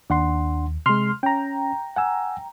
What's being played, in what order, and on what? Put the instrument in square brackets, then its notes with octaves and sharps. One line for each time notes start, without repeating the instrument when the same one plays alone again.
[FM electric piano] D#2 [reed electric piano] D4 F#5 C6
[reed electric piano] C3 G#3 [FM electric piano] C6 F6
[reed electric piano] C#4 [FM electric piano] G5 A#5
[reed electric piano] F#5 G#5 E6